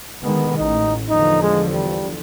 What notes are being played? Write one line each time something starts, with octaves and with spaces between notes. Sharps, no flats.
D3 D#3 G#3 B3
A1 D#4
E2 D3 F3 D#4
G#3
G3